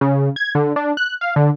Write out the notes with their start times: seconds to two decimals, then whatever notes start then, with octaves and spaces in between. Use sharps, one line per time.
0.01 C#3
0.36 G#6
0.55 D3
0.76 D4
0.97 F#6
1.21 F5
1.36 D3